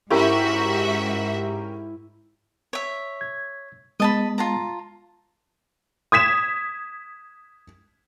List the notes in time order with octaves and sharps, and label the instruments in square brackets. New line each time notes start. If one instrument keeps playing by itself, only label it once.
[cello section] G#2 [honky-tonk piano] C#4 G4 A#4 [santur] E4 [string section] F#4 E5
[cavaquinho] C#5 E5
[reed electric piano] G#6
[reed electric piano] G#3 B3 [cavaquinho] D#5 A5 B5
[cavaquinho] F4 A5 A#5
[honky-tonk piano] D#6 G#6 B6 E7